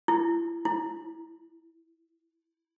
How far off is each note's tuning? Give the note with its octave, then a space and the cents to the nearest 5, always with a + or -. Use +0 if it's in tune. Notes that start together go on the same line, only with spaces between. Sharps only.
E4 +35
E4 -10